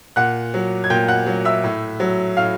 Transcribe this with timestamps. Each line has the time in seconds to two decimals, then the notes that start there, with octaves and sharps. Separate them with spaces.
0.16 A#2 F#5 F#6
0.54 F#3
0.84 G#6
0.90 A#2 G5 G6
1.08 F#5 F#6
1.27 F#3
1.45 E5 E6
1.64 A2
2.00 F#3
2.37 A2 F5 F6